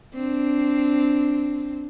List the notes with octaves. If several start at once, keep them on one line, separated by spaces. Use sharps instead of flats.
C4 D4